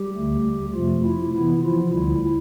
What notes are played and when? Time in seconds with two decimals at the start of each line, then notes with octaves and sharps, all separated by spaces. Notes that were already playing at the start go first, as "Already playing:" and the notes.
Already playing: G3 G4
0.15 D2 D3 A3
0.74 F2 C3 F3 A3 F4
1.04 E4
1.32 C3 E3 B3 E4
1.63 F3 F4
1.92 D2 D3 G3 E4